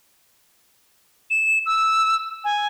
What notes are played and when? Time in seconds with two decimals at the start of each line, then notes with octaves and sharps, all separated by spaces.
1.30 E7
1.66 E6
2.44 G#5